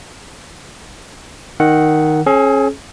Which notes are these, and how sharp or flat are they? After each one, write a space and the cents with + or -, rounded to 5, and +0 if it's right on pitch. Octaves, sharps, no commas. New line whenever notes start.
D#3 +0 F#5 +0 E6 +5
C#4 -30 G#4 +35